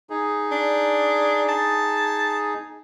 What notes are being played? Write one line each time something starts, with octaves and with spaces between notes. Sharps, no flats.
D#4 G#4
D4
A5